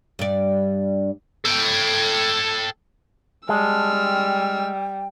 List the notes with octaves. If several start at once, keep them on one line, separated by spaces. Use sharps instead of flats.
G2 D5
A4 G5
G3 G#3 A5 E6 F6
G5